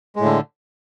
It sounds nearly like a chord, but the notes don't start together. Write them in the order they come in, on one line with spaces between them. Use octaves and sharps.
G#3 A2 D3